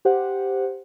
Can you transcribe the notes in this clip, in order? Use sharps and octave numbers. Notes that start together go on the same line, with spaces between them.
G4 C5 F#5